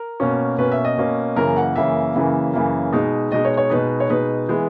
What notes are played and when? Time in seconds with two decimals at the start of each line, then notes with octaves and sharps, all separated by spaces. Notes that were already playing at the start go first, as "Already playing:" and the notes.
Already playing: A#4
0.20 B2 A#3 C#4
0.58 B2 A#3 C#4 B4
0.72 E5
0.85 D#5
0.97 B2 A#3 C#4
1.36 F#2 C#3 E3 A#3 A#4
1.56 F#5
1.76 F#2 C#3 E3 A#3 E5
2.15 F#2 C#3 E3 A#3
2.53 F#2 C#3 E3 A#3
2.92 B2 G#3 D#4
3.31 B2 G#3 D#4 D#5
3.45 C#5
3.57 C#5
3.70 B2 G#3 D#4 B4
4.00 C#5
4.09 B2 G#3 D#4 B4
4.48 E3 G#3 B3